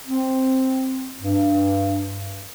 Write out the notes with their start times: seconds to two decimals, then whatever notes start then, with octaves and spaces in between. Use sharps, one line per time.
0.06 C4
1.21 G2